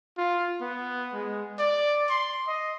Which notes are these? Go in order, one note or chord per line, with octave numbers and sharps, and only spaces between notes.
F4
B3
G#3
D5
C6
D#5